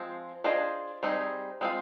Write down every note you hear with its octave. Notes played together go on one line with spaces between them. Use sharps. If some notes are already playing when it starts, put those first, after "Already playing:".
Already playing: F3 G#3 C4
D4 F4 G#4 C5 D#5
G3 C4 D#4 G#4
G#3 C4 F4